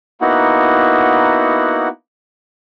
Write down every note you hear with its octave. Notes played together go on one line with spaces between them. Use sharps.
A#3 B3 D#4 E4 F#4 F#5